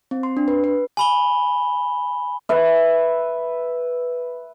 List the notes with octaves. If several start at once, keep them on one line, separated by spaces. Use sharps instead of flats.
C4
C6
D4
B4
B4
G#5 B5 G7
B4 E5